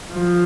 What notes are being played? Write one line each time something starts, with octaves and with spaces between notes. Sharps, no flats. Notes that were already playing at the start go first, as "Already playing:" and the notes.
F3